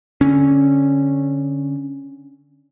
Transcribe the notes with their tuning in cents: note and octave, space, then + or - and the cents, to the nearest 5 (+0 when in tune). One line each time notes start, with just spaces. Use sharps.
D3 -15 C#4 -5